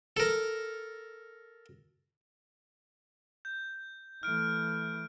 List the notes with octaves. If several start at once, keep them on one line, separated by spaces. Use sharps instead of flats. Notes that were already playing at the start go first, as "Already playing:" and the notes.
A4 A#4
G6
E3 A3 F6 D7